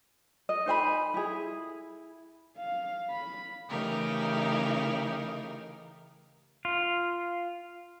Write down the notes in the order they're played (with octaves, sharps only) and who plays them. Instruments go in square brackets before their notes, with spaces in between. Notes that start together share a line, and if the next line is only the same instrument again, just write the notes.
[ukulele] D#5
D#4 C5 G#5 B5
E4 G#4
[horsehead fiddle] F5
B5
[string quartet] C#3 E3 A3 D#4 G4 A#4
[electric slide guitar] F4